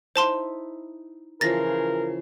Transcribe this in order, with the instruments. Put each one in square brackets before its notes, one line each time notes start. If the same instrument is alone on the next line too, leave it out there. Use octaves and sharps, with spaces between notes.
[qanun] D#4 E4 [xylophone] C5 A5 C6
[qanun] C#3 E3 F3 [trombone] A#4 [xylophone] A6 A#6